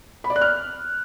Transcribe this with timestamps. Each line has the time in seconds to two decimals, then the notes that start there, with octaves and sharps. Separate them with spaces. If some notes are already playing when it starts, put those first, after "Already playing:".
0.24 B5
0.30 D5
0.36 F#6
0.41 F6